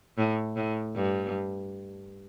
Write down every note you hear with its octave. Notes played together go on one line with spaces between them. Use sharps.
A2
A2
G2